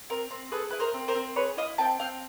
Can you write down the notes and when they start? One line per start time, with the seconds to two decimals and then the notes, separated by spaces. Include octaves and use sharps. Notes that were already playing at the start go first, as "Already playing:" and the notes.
0.10 C4 A#4
0.31 C4
0.52 G#4 A4 B4
0.70 E4 B4
0.80 A#4 C5
0.94 C4
1.08 A#4 C5
1.15 C4
1.36 G#4 B4 C#5
1.57 E4 D#5 F5
1.78 C4 G5 A5
2.00 C4 F5 G5